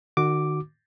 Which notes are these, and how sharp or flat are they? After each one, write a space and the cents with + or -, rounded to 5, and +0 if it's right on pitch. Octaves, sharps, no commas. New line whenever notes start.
D#3 -40 F#4 +0 D6 +0